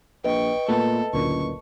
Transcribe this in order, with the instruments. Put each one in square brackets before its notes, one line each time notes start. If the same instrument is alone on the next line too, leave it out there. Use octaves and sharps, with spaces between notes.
[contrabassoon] A#1 [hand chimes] B4 D#5 [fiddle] G5 C#6
[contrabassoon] A#2 [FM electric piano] A3 B3 [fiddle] A4
[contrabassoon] F#1 [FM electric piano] D2 A#2 [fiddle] C#6